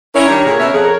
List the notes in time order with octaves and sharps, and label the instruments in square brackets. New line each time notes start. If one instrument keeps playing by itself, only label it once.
[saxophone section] C#4 E4 [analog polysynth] A#4 C#5
[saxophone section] D#3 G3 D4
A#2 D3 G#4
B2 C#4 E5
F2 G#4